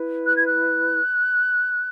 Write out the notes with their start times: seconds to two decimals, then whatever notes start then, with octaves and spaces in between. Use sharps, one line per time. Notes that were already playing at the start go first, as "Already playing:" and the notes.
Already playing: E4 B4
0.25 F#6
0.36 G#6
0.46 F#6